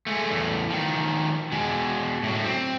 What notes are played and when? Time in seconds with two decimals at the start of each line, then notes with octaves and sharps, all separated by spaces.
0.07 G#3 A3
0.30 E2 A2
0.70 D#3 F3
1.52 B2 G#3
2.23 A2 F#3
2.45 C4